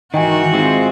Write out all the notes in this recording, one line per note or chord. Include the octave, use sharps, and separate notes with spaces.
G#2 D#3 E3 F#4 D#5 G5 G#5
G#3 C4 F4